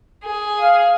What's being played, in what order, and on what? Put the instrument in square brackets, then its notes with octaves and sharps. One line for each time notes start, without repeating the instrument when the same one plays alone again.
[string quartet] G#4
[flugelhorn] F5